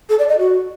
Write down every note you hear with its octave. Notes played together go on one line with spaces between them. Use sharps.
A4
D5
D#5
F#4